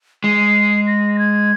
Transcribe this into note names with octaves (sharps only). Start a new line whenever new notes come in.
G#3 C7
A#6
A#6
G#6